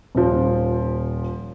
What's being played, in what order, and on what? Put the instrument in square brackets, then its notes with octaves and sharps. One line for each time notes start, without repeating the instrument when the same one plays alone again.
[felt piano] D#1 F3